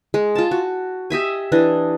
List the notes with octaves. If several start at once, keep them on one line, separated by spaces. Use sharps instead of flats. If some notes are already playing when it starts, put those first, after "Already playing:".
G#3
F4 A5
F#4
G4 D#5 E5 G#5
E3 D4 D#5